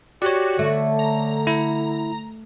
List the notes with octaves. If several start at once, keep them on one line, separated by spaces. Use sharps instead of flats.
F#4 G4 C#5 D5
D3 A3
A#5
E4